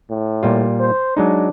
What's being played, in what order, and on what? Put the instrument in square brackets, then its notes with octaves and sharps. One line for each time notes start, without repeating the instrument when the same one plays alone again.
[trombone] A2
[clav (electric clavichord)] A#2 G3 F4
[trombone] C5
[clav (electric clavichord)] F#3 G#3 D#4 [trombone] D4